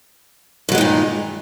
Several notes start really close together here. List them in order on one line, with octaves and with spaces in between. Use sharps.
G2 F#3 G#3 D#3 A#2